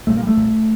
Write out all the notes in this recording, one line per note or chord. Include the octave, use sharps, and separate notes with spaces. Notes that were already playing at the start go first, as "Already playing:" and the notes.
C2 A#2 A3
A#3
G3
A3
C2 A#2